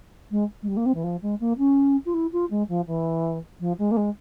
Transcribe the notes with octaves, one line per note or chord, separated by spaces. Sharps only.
G#3
G#3
G3
A#3
C4
E3
F3
G#3
A#3
C#4
F4
E4
F4
G#3
F3
E3
F3
G#3
A#3
G#3